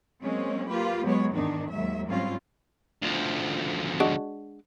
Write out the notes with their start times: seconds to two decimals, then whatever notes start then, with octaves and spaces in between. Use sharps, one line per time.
0.22 F#3 G#3 A#3 C4 C#4
0.69 A#3 F4 G4 B4
1.04 F#3 G#3 B3 C#5
1.33 E2 G#2 D#3 D4 D#4
1.69 D#2 F#3 G#3 E5
2.06 G#2 F#3 G3 C4 C#4 F4
3.02 D2 F3
4.00 G#3 D4 F#4